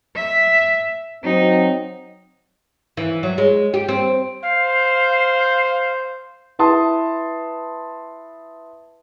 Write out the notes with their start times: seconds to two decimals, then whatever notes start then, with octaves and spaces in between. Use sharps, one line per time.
0.15 E5
1.24 F#3 C4 D#4
2.97 E3
3.23 F#3
3.38 G#3
3.74 G4
3.88 C4
4.43 C5 F5
6.59 E4 B4 A5 C6 D#6